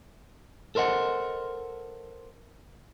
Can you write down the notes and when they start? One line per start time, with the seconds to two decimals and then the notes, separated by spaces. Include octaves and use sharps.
0.75 A4 A#4 C5 D#5 F#5